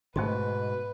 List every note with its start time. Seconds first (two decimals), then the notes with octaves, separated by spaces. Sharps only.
0.16 G#2 B2 A3 B4 C5 C6